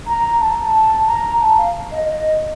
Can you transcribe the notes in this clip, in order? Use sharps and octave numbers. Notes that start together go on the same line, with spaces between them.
A#5
A5
A5
A#5
A5
F5
D#5
D#5